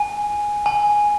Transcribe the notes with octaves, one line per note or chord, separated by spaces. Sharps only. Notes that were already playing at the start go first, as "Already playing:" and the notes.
Already playing: G#5
G#5